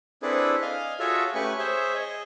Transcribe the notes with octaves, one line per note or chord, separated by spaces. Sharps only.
C4 D4 E4 G#4 A4 B4
D#5 F5 G#5
F4 F#4 G#4 A4 C#5 E5
A3 C#4 G4 B4 G#5 C#6
G#4 C5 C#5 E5
G#4 D#5